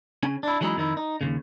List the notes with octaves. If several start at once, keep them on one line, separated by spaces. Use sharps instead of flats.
C#3 C#4 G#5
D4 E4
E3 F#3 G#3 C#4 D#4 E4
F2 D#3 D#4 E4
D#4
D#2 A#2 C#3